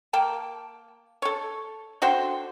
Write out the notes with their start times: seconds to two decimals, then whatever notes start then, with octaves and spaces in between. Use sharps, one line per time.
0.13 A#3 G5 A5
1.22 A4 C#5
2.02 D3 F#4 C5 G5